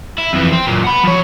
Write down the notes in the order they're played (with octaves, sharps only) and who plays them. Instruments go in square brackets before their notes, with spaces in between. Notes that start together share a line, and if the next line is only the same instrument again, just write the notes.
[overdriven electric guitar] E4
F2 E3
C4
F#2 A#2
F#5 B5
F3 C#5